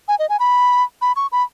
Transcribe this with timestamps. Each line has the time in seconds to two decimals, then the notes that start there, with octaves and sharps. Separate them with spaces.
0.08 G#5
0.19 D#5
0.29 G#5
0.40 B5
1.02 B5
1.16 C#6
1.32 B5